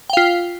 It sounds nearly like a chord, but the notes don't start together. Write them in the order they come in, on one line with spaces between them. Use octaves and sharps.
G5 F5 F4